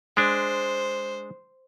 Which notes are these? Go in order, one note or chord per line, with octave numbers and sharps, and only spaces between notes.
G#3 D4 C5